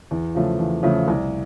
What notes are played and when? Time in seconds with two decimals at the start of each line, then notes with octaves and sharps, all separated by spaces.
0.11 E2
0.35 C#3 F3 A3
0.59 E2
0.83 C#3 F3 A3
1.08 C2